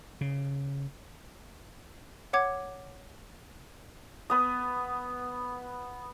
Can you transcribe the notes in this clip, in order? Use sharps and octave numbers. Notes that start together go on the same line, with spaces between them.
C#3
C#5 F#5 D6 G#6
B3 D#6